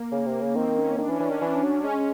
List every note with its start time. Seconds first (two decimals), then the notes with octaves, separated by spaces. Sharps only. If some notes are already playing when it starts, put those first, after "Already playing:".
Already playing: A#3
0.11 C#3
0.26 C3
0.40 C#3
0.55 D#3 C4
0.77 C#4
0.98 D#3 D4
1.08 E3 C#4
1.20 E3 D4
1.30 D#3 C#4
1.41 E3 D4
1.63 F#3
1.84 G#3 C#4